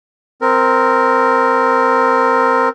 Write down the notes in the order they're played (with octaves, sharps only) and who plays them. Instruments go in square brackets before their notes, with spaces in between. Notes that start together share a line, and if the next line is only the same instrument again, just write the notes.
[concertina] C4 A#4